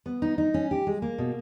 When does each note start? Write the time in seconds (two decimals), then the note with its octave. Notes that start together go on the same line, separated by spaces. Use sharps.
0.06 B3
0.22 D#4
0.38 D#4
0.54 C#4
0.71 G4
0.87 G#3
1.02 A#3
1.18 B2